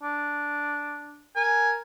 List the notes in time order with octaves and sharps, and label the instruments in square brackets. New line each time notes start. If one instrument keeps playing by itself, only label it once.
[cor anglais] D4
[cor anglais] A#4 [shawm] G#5